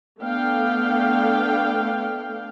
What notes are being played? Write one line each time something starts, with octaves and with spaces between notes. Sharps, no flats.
A3 B3 D4 F5 G5